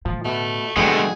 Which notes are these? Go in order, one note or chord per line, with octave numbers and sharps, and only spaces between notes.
A2 D3 F3
B2 A3
F2 B2 D3 F#3 G#3 A3 G4 G#4